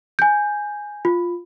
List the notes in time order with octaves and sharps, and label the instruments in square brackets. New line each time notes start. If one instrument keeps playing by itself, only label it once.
[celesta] G#5 G6
F4